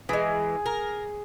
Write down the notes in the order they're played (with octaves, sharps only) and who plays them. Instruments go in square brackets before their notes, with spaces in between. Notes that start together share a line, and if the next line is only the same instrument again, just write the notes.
[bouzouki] E3 G#3 [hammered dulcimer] G#4
[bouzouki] A#4